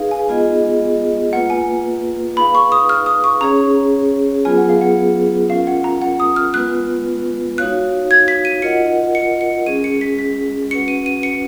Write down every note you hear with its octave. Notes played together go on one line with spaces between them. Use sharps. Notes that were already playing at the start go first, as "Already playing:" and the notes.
Already playing: D#4 G#4 B4 F5
G#5
G#3 B3 F4 G#4 D#5
A#3 F4 B4 F#5
G#5
D#4 G#4 B4 F5 B5
C#6
D#6
F6
D#6
C#6
C#4 G#4 C#5 A#5
F#3 B3 F4 G#4 B4 G#5
F#5
F5
F#5
C#4 F4 A#4 F5
F#5
A#5
F#5
D#6
F6
G#3 B3 F4 B4 F#6
D#4 F#4 C#5 F5 F#6
G#6
B6
D#7
F4 A#4 D#5 F#5 C#7
C#7
C#7
G#3 C#4 G#4 D#7
C#7
B6
B6
C#4 F#4 B4 F#5 C#7
D#7
D#7
C#7